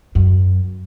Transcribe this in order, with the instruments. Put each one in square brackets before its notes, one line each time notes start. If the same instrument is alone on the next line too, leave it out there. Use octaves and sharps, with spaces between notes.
[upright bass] F#2